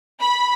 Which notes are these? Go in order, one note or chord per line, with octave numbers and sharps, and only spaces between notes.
B5